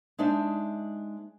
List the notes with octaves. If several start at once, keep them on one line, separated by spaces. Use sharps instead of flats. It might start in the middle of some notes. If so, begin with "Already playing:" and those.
G#3 D4 D#4 C5 E5